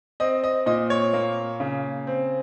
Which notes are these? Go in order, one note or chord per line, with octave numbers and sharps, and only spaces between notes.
C4 D#5
D#5
A#2 D#5
C#5
A#3
C#3
C4